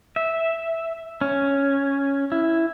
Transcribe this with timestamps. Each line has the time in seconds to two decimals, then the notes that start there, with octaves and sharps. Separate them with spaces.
0.16 E5
1.21 C#4
2.32 E4